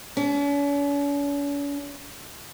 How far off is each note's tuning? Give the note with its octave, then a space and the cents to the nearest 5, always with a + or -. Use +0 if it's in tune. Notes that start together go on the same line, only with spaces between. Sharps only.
C#4 +45